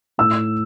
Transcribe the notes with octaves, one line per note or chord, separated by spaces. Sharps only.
A2 E6